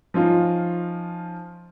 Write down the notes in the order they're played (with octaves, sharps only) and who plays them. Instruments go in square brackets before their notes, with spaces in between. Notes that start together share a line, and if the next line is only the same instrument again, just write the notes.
[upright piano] F3 C#4 D#4 F4